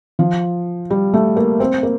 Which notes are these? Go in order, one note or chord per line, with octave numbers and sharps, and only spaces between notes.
F3
G3
A3
A#3
C4
A#3